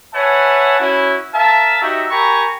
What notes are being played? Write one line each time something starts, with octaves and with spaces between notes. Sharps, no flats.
B4 C#5 E5 F#5 G#5 A5
C#4 E4 F#4
A#4 E5 F5 A5
D#4 F#4 G4 C#5 E5
G4 A#4 G#5 A#5 B5 C#6